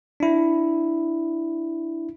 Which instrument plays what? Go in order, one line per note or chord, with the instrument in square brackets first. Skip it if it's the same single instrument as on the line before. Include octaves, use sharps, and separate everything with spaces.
[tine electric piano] D4 E4